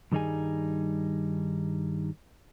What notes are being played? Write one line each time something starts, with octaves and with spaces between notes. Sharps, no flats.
G2 D#3 G3 D#4 G#4 G#5